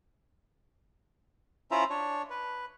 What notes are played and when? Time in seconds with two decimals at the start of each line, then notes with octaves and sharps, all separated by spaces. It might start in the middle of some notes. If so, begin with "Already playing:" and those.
1.71 C#4 E4 F4 C5 E5 A#5
1.90 D4 C#5
2.30 B4